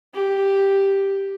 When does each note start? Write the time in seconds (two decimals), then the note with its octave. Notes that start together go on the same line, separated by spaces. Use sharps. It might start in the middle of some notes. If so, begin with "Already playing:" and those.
0.14 G4